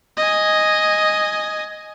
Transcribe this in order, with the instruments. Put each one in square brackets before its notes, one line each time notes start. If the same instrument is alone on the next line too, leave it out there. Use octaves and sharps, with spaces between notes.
[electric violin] D#5 G#5